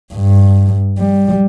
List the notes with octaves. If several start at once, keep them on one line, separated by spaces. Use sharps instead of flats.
G2
G3